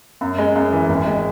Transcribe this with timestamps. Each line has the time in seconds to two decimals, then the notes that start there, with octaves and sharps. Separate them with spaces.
0.21 F#2
0.38 G#3
0.56 F#2
0.73 E3
0.89 G#1
1.06 G#3